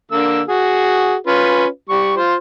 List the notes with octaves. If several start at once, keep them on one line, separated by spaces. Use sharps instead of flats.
D3 A#3 E6
F#4 G#4
C#4 F4 B4
G3 C#6
F4 C5